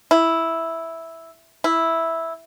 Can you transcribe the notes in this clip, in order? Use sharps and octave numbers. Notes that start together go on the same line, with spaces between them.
E4
E4